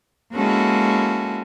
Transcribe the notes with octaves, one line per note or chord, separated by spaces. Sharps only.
G#3 A#3 C#4 E4 F#4 A4